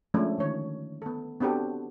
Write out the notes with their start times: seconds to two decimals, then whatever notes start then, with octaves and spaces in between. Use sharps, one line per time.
0.14 F3 G#3 A3 C#4 D4
0.38 D3 D#3 C#5
1.02 B3 A4
1.41 B3 C4 D4 F#4 G4 A4